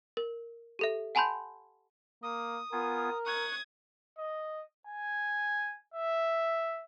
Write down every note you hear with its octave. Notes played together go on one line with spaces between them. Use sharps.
A#4
G4 A4 E5
F#5 G#5 A5 B5 C6 G6
A#3 D#6
B3 F4 A#4 G#5
C#6 D#6 F#6 G#6
D#5
G#5
E5